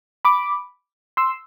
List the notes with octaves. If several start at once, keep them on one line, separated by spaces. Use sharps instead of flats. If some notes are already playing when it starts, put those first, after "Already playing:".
B5 D6
C6 E6